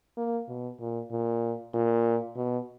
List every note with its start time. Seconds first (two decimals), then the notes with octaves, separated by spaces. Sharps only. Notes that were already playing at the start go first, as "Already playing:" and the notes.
0.17 A#3
0.48 B2
0.80 A#2
1.11 A#2
1.74 A#2
2.36 B2